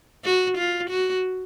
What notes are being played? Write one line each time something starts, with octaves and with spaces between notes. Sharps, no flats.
F#4
F4
F#4